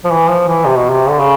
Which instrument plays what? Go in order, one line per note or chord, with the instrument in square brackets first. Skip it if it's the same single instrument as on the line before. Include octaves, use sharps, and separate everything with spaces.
[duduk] F3
E3
F3
E3
C3
B2
C3
D3
C#3